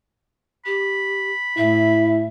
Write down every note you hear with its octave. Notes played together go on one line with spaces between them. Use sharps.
G4 B5
A2 E4 E5